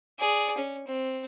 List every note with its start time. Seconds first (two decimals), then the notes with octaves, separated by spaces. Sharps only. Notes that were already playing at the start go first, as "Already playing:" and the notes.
0.19 G#4 D5
0.57 C#4
0.87 C4